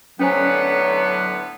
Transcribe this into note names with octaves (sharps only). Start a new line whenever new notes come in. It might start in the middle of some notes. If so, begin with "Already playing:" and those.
A2 D3 F#3 B3 C#4 C5 G#5